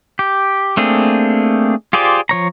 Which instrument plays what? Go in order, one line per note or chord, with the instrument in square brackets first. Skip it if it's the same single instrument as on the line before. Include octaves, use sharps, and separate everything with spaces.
[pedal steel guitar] G4
A3 A#3 C4 D4 G#4
F4 G4 G#4 C5 D5
F3 C#5 A#5